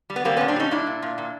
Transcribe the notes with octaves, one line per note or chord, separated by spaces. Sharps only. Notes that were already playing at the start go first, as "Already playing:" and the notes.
G3
B3
G3 A#3 C4
A#2 B3 C#4
C4 D4
G3 C#4 D#4
A#2 D4 E4
A#2
A#2
A#2